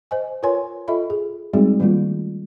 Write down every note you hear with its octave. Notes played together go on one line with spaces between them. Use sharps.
C5 D#5 G#5
F4 A#4 B4 C#5 G#5 C6
F4 A4 D#5 E5 B5
G#4
G3 G#3 C4 D#4 F#4 G#4
D#3 G3 A3 A#3 F4